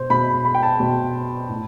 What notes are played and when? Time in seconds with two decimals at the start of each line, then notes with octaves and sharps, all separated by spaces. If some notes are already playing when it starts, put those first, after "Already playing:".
Already playing: B2 C5
0.10 B2 B5
0.45 B5
0.55 G5
0.63 A5
0.80 B2
1.49 A2